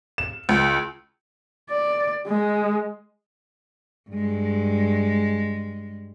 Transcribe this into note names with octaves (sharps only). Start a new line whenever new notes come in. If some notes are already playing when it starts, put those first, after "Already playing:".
E7
C#2
D5
G#3
G2 G#3